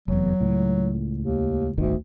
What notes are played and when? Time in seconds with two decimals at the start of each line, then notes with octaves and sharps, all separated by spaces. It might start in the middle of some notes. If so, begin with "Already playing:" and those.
0.08 F1 E2 F#3
0.40 C#2 A2
1.18 D#2
1.77 D1 G1 D2 D#3